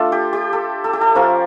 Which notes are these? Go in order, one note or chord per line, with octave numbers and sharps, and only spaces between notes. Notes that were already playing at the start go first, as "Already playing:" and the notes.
Already playing: A3 D4 F4 A4
G4
G4
A4
A4
G4
A4
F3 C#4 F4 A#4